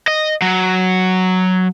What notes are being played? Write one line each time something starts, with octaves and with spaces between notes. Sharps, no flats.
D#5
F#3